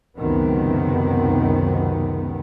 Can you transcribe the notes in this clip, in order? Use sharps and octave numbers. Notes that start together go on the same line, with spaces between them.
C#2 F#2 C3 D#3 B3 C4